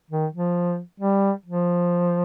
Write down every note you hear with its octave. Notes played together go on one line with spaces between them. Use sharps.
D#3
F3
G3
F3